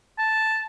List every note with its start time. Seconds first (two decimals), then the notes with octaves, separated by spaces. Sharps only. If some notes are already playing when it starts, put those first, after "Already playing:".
0.19 A5